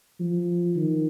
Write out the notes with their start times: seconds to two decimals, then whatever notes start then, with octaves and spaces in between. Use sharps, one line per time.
0.20 F3
0.76 D#3